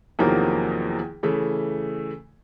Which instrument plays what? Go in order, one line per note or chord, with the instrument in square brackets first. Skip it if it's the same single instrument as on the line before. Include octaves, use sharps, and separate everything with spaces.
[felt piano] E2 C3 D#3 F3 F#3 A#3
C#3 E3 A3